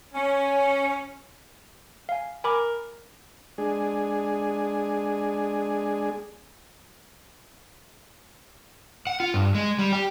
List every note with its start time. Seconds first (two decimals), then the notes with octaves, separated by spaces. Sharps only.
0.14 C#4
2.09 F5 G#5
2.44 A#4 G#5 B5 D6
3.58 G#3 D4 G#4
9.07 F#5
9.20 F4
9.34 G2
9.55 G#3
9.79 G3
9.93 G4